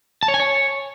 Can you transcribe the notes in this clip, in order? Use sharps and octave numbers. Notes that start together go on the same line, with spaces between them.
A5
C#5
G#5
C#5